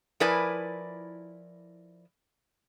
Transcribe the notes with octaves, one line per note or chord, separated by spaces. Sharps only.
F3 E4 A#4 B4 D5 G#5